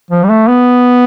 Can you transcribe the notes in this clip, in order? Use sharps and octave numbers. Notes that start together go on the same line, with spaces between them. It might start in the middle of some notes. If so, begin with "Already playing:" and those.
F3
G3
A3
B3